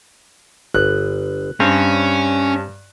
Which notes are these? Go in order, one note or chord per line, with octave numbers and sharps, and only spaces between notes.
G1 F#6
G2 C4 C#4